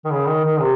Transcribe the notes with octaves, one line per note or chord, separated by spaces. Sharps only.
D#3
C#3
D#3
D#3
C3